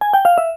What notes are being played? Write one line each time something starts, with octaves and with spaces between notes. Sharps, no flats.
G#5
G5
F5
E5